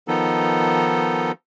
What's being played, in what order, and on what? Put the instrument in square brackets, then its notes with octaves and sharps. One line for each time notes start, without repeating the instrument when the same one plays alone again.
[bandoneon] D#3 F3 B3 D#4 A4